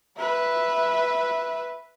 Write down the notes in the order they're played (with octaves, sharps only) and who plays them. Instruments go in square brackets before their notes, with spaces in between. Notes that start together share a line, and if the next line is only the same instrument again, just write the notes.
[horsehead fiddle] B4 E5